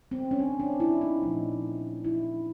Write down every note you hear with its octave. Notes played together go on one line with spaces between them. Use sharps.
C4
C#4
D4
D4
E4
D#4
A#2 F3 A3
E4